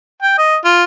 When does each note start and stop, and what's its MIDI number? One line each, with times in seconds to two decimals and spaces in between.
0.22 0.37 79
0.38 0.56 75
0.65 0.84 65